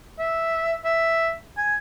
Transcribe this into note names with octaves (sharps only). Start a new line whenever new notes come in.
E5
E5
G#5